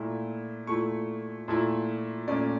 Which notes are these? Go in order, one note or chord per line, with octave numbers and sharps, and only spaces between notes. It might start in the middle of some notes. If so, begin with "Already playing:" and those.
Already playing: A#2 A3 E4
A#2 A3 E4 C#6
A#2 A3 E4
A#2 A3 C#4 D5